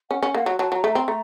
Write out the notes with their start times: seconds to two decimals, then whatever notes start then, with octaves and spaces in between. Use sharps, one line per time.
0.10 C#4 F#5
0.23 C#4
0.34 A#3 F#5
0.46 F#3
0.59 F#3 A5
0.72 F#3 A#5
0.84 A3
0.92 C4 A#5
1.07 A3 A#5